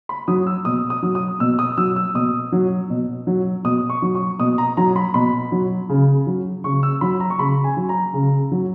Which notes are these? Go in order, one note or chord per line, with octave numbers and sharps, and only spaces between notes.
B5
F#3 D#6
E6
B2 D#6
D#6
F#3
D#6
B2 E6
D#6
F#3 E6
E6
B2 D#6
F#3
B2
F#3
B2 D#6
C#6
F#3
C#6
B2 D#6
A#5
F#3 A#5
B5
B2 B5
F#3
C#3
F#3
C#3 C#6
E6
F#3 B5
A#5
C#6
C#3 B5
G#5
F#3
A#5
C#3
F#3